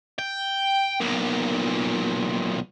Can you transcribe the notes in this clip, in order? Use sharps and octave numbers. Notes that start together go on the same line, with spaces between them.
G5
B1 A#2